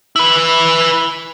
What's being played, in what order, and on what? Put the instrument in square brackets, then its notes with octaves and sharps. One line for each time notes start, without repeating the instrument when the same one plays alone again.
[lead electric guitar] E4 B4